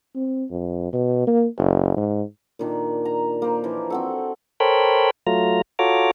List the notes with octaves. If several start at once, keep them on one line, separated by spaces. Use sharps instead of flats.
C4
F2
B2
A#3
F#1
G#2
A#2 D#3 D4
A#5
A#3 C5
E3 F3
C4 F#4 A4
A4 A#4 C5 C#5 G5 B5
F#3 A3 F4 A#5
F4 F#4 A4 C#5 A#5 D6